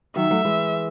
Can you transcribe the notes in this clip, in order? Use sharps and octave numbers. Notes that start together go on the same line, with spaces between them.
D#3 F#3 E5
F#3 A3
E3 G#3